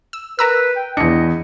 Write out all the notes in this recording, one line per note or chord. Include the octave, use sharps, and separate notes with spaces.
E6
A#4 B4 A#5 E6
G5
E2 D4 E4 D#5 C#7